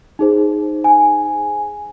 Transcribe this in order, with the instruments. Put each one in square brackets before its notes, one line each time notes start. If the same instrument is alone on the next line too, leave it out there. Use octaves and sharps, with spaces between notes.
[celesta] D#4 G#4 C5
G#5